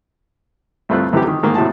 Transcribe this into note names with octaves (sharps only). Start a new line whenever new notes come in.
C2 G2 A3 C4 F4 F#6
C2 F#2 E3 A3 G4
D#3
G#2 D#3 A#3
A2 C3 F#3 A5